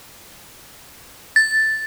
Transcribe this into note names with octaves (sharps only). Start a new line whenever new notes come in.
A6